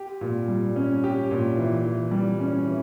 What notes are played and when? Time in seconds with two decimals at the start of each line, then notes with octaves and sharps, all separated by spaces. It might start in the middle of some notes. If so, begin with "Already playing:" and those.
Already playing: G4
0.21 A#2
0.48 G3
0.76 C#4
1.04 G4
1.31 A#2
1.57 E3
1.85 E3
2.11 G3
2.40 C#4
2.66 E3